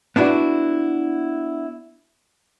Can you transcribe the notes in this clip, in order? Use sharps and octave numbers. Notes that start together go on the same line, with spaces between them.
B3 D4 E4 F#4